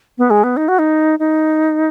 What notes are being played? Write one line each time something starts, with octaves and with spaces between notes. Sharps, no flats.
B3
G#3
B3
D#4
F#4
D#4
D#4